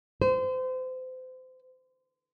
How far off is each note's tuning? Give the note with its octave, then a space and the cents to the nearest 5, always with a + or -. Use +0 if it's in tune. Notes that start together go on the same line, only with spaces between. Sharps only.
C5 -30